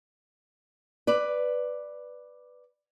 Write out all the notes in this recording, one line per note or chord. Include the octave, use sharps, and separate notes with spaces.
B4 D5